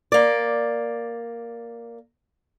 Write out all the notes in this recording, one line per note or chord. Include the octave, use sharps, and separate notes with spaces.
A#3 D5